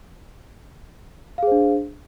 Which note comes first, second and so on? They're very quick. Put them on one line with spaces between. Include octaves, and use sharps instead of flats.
F5 G#4 C5 D4